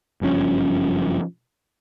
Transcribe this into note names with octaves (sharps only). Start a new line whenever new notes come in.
F#1 G2 F3 C#4